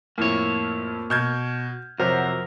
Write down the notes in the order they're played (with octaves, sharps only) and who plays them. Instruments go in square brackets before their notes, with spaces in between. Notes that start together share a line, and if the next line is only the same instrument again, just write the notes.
[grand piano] F2 A2 [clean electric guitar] A#3 C#5
[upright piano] B2 [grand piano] F6 G6 G#6
[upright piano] F2 [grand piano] C3 [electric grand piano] F#3 C5 F#5 [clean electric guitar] A#4